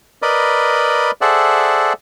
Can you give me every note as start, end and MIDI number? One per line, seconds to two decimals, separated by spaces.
0.22 1.11 70
0.22 1.11 71
0.22 1.11 74
0.22 1.11 75
0.22 1.11 83
1.21 1.93 68
1.21 1.93 69
1.21 1.93 72
1.21 1.93 74
1.21 1.93 76
1.21 1.93 78